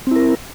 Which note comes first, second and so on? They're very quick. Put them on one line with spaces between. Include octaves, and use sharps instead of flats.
C4 E4 A#4